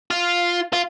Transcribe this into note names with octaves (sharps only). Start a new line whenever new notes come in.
F4
F4